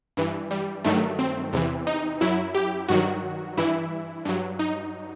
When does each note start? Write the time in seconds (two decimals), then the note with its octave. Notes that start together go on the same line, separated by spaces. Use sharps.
0.17 G2 E3
0.51 G3
0.84 G2 D#3 F#3 A3
1.19 C4
1.53 E2 C3 E3
1.87 D#4
2.21 F#2 F#3 E4
2.55 G4
2.89 G2 D#3 F#3 F#4
3.57 G2 E3 E4
4.25 G2 F#3
4.59 D#4